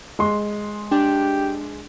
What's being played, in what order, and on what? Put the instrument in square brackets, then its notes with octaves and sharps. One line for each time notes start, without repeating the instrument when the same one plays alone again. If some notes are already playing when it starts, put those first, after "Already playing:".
[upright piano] G#3 C6
[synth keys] D4 [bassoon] G4